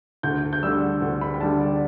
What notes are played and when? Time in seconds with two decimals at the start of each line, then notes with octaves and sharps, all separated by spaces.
0.23 D2 G6
0.53 G6
0.63 D3 G3 E6
1.02 D2
1.21 B5
1.34 G5
1.41 D3 G3 A5
1.61 D5